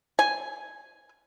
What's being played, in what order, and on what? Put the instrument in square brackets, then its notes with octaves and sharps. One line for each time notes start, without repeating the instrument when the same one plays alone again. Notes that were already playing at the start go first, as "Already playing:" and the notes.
[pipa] G#5